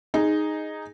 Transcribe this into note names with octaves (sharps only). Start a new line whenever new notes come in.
D#4 G#4